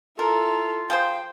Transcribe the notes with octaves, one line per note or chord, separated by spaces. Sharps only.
E4 F4 A4 A#4 A#5
F3 G#4 C5 F5 G5